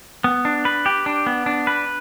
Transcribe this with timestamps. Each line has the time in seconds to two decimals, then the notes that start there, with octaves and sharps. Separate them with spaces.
0.24 B3
0.45 D4
0.65 B4
0.86 G4
1.06 D4
1.26 B3
1.46 D4
1.67 B4